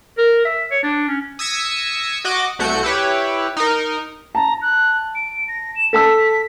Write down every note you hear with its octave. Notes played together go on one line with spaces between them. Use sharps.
A#4
E5
C#5
D4
C#4
D#6 E6 G#6 A#6 B6 C#7
F#4 D#5 D6
C2 A3 F#4 G6 C#7
E4 G4 B4 C#5
D#4 A#4
A5 A#5
F#6
D7
A#6
E7
A4 A5 E6 B6